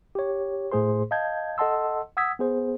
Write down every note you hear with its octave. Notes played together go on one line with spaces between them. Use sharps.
G4 C#5
A2 A3 G#4 C5 C6
D#5 F5 A5 G6 G#6
A4 D#5 F#5 A5 C6 E6
F#5 D#6 E6 G#6 B6
B3 G#4 C5